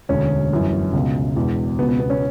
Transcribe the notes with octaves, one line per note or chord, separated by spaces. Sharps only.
E1 D2 D3 C#4
G1 F#2 E3
C#2 B2
E1 E2 B2
C#2 B2 B3
B3
B3
C#4